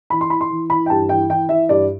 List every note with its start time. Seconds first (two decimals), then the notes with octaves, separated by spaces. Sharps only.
0.10 E3 B5
0.21 C6
0.30 E3 B5
0.41 C6
0.50 E3
0.70 E3 B5
0.86 G5
0.90 G2 A5
1.09 E3 G5
1.29 E3 G5
1.49 E3 E5
1.69 G2 D5